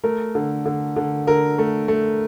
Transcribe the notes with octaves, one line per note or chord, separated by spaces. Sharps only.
A3 A#4
D3
D3
D3
D3 A#4
A3
A3